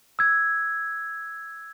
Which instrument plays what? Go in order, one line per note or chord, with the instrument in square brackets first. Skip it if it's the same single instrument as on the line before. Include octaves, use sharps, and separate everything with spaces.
[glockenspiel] E6 G#6